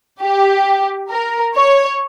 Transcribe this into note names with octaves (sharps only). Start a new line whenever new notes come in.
G4
A#4
C#5